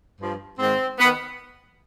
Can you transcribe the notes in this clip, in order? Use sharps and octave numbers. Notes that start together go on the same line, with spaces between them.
G2 F3
G#2 D#3 C4
D#3 B3